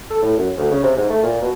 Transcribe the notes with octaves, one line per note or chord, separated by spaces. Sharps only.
A4
A2
F#2
D2
C#3
C3
G#2
A3
A#2
B2